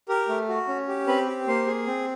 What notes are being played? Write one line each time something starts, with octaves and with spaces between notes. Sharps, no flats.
G4 A#4
A3
F#4
C#4
G4
C4 B4
G4
A#3 C5
G#4
C4